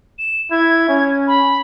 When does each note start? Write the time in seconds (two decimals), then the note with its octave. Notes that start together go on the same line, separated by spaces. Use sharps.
0.19 E7
0.51 E4 G#6
0.89 C#4
1.27 B5